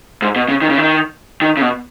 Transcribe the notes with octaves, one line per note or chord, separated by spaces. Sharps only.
G#2
B2
C#3
D#3
C#3
D#3
D#3
C#3
B2